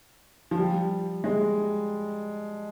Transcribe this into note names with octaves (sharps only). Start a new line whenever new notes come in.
F3
G3
G#3